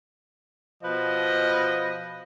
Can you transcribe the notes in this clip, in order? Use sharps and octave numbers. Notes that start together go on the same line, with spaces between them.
B2 F3 B4 D#5